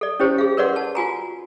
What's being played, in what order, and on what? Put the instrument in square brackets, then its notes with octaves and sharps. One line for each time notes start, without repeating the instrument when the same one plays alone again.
[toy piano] A4 D5
C#4 E4 G4 C5 C#5
G#4 F5
A#4 B4 C#5 D5 F#5 C6
A5
F4 F#4 G#5 A#5